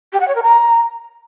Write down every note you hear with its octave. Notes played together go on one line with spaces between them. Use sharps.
G4
F#5
C#5
A#4
A#5